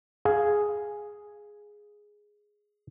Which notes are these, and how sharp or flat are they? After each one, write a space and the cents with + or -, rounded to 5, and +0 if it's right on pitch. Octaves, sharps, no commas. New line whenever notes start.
G#4 +0 F5 +0